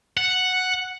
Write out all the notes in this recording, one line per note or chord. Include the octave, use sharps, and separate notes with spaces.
F#5